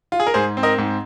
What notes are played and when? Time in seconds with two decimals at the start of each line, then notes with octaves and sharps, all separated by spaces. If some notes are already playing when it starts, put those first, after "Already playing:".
0.12 F4
0.20 G#4
0.27 A#4
0.34 G#2 G#4 C5
0.57 C4
0.63 A#4 D#5
0.78 G#2